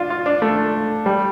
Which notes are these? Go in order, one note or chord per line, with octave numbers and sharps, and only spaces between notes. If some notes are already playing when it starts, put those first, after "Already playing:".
Already playing: D4 F4
F4
D4
A3
G3